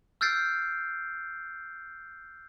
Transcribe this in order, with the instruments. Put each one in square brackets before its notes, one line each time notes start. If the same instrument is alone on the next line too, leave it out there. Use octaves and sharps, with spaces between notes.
[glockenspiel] E6 F6 G6 A6 C7 D7